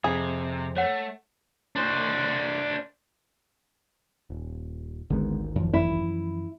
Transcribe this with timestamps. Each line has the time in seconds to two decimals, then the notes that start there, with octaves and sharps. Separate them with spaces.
0.04 F2 C3 G#4
0.76 A3 C#5 F#5
1.76 D4 C5
4.30 D#1
5.10 G#1 D2 D3 D#3 G#3 B3
5.55 F#2 E3 F3
5.73 E4